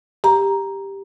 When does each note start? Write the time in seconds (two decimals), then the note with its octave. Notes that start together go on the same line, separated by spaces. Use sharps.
0.24 G4 A#5